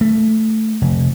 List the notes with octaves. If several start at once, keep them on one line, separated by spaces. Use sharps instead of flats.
A3
F1